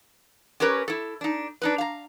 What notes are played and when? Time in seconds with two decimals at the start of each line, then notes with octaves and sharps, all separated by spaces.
0.60 C#4 G4 A#4 B4 C#5
0.88 E4 A4
1.21 D4 D#4
1.62 D4 D#4 B4
1.78 F5 A#5